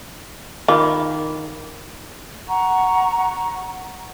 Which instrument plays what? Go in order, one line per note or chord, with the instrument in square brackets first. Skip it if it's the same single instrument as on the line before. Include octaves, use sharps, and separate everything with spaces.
[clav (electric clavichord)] D#3 [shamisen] F4 [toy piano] B5 D6
[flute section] F#5 A#5 C#6